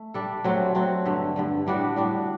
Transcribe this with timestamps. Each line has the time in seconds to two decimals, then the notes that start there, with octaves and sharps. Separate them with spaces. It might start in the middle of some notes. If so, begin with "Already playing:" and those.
Already playing: A3
0.14 G3 D4 A4
0.44 F#3 A3 C4 F#4
0.75 F#3 A3 C4 F#4
1.05 G2 D3 A3
1.36 G2 D3 A3
1.67 A2 G3 D4 F#4
1.96 A2 G3 D4 F#4